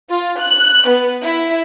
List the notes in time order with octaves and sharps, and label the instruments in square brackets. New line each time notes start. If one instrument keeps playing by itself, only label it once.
[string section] F4
F#6
B3
E4